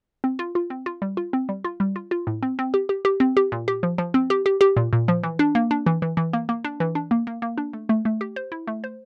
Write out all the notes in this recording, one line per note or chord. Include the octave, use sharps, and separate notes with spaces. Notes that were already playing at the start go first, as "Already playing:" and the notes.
C4
F4
F4
C4
F4
G3
F4
C4
G3
F4
G3
F4
F4
A2
C4
C4
G4
G4
G4
C4
G4
A#2
G4
F3
F3
C4
G4
G4
G4
A#2
A#2
F3
E3
D4
A#3
D4
E3
E3
E3
A#3
A#3
D4
E3
D4
A#3
A#3
A#3
D4
A3
A3
A3
G4
C5
E4
A3
C5